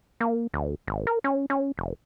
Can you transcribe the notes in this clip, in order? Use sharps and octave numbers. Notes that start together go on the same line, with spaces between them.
A#3
D2
G#1
A#4
C#4
C#4
F1